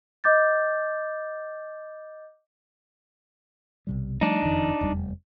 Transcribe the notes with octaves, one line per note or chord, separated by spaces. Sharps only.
D#5 D6 G6 A6
B1 C3 G3
F3 G3 A3 D4 D#4
F#1 F2 D#3
F1 E2 G3